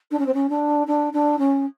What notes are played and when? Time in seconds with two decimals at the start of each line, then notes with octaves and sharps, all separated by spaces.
0.11 D4
0.19 C#4
0.26 C4
0.34 C#4
0.49 D4
0.87 D4
1.13 D4
1.39 C#4